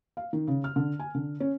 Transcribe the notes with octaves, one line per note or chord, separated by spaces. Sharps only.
F5
D#3
C#3
F6
D3
G#5
D3
C#4